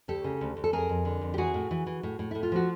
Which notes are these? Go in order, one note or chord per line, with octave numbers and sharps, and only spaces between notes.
D2 G4 A4
C#3
D2
D2
A4
F2 G#4 A#4
F2
D3
F2
G4
E3 F#4 G#4
A2
E3
E3
A2
A2
A2 E4
F4
F3 F#4